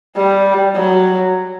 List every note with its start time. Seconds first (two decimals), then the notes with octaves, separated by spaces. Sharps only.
0.16 G3
0.75 F#3